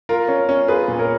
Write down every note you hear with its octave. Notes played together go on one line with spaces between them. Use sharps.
F4 A#4
C#4
C#4
F4 G#4 B4
A#2
A#4 C#5